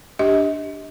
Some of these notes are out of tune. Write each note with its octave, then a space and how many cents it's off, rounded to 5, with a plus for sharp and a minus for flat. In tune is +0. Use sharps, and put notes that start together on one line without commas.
D4 +0 G4 +0 D#5 +35